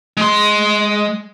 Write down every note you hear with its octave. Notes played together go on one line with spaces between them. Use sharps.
G#3 C6